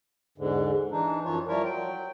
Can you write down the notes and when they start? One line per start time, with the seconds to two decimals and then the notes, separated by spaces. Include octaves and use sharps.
0.38 E2 G#2 D3
0.92 E3 D4 D#4
1.25 F#2 E3 F3 F4 C#5
1.48 F3 G3 E4 F4 A#4 C#5
1.64 F#3 G5